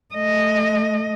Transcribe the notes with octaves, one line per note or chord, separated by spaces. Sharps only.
A3 D#5